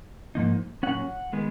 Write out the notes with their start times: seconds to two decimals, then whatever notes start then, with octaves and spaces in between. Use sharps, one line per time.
0.35 G#2 F3 A#3 D#4
0.83 A#2 F#3 C#4 F#5
1.33 D#3 G#3 B3